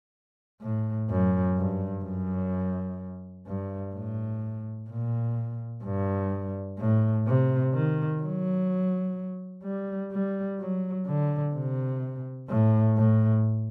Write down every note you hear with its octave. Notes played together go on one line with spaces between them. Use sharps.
A2
F#2
G2
F#2
G2
A2
A#2
G2
A2
C3
D#3
F#3
G3
G3
F#3
D3
C3
A2
A2